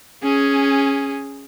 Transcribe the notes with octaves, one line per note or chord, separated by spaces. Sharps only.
C#4 G#4